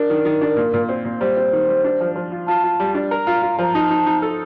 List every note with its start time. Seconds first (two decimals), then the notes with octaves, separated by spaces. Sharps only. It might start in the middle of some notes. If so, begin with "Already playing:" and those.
Already playing: D4 A#4
0.10 D#3
0.25 D#3
0.42 D4
0.57 A#2
0.73 A#2
0.89 C4
1.04 A#2
1.20 G3 C5
1.37 C4
1.53 D#3
1.68 G3
1.84 D4
2.01 F3
2.16 F3
2.32 F4
2.47 F4 A5
2.64 F4
2.80 G3
2.95 D4
3.11 A#4 A#5
3.27 F4
3.42 F4
3.58 F3 A#5
3.74 D#4 A5
3.91 D#4
4.06 D#4
4.22 A4